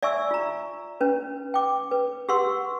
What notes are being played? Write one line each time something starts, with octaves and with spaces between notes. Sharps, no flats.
D5 E5 G#5 C#6 E6
F4 A#5
C#4 B4
G5 D6
B4
G4 B4 F#5 C6 C#6 E6